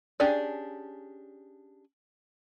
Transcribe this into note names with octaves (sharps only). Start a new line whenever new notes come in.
C#4 D4 G4 G#4 D5